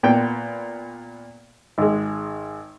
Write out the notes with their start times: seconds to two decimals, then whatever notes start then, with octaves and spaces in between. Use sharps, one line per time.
0.03 A#2 B3 G5
1.78 G#1 G#3